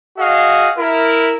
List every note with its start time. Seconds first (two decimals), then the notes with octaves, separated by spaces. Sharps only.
0.18 F#4 G#4 D#5 F5
0.77 E4 A#4